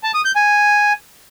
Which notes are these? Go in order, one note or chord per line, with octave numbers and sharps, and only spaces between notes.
A5
D#6
G6
G#5